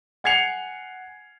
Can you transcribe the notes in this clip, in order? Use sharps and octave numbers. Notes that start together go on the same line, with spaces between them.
F#5 G#5 G#6 C7 C#7 F7